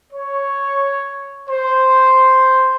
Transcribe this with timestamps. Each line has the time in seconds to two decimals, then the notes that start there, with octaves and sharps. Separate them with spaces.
0.13 C#5
1.49 C5